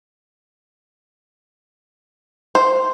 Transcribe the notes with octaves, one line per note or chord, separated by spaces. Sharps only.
C5